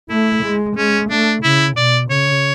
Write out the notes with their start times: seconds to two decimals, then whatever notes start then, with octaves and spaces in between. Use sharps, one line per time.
0.09 A3 E4
0.43 G#3
0.76 G#3 C#4
1.10 A3 D4
1.43 C#3 E4
1.76 B2 D5
2.10 C#3 C#5